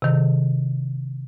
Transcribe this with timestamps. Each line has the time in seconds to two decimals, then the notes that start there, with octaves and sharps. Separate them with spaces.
0.02 C3 D#3